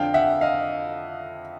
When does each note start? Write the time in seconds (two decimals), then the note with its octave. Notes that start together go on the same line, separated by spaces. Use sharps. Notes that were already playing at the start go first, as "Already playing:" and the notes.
Already playing: F2 D3 F5 G5
0.14 E5 F#5
0.41 D#5 F5